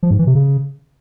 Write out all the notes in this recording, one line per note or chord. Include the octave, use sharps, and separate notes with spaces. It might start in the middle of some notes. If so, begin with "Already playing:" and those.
F3
G#2
E3
C3
C#3